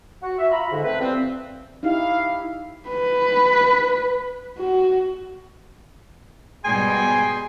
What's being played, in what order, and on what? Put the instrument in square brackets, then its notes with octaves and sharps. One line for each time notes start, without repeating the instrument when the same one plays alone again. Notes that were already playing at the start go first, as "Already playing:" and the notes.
[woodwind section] F#4
E5
F4 A#5 B5
G#2 D3
A3 C4 B4
E3 F3 G3 C4
[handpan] D#4 E4 G4 [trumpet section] F5
[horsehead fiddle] B4
F#4
[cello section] G#2 B2 G3 [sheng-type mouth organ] G#4 G5 C6 [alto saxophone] G#5